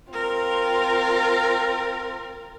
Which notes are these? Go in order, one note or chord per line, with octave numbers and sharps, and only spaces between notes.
C4 F4 A#4